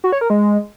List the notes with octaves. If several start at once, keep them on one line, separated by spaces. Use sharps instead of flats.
F#4
C#5
A#4
G#3